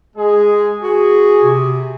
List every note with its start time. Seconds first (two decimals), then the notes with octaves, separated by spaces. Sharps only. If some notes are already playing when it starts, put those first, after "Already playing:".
0.16 G#3 G#4
0.82 F#4 G#4
1.43 C3